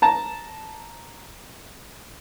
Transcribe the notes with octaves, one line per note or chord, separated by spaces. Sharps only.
A5 A#5